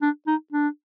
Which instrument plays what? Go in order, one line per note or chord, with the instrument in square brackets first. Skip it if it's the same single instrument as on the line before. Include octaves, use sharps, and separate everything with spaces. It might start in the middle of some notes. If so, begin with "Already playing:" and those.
[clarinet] D4
D#4
D4